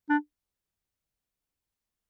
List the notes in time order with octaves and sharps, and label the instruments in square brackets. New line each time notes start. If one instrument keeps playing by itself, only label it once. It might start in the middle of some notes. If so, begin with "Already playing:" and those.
[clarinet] D4